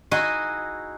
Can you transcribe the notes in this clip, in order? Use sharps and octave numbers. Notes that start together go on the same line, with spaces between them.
D#4 E4 F#4 G#4 D#5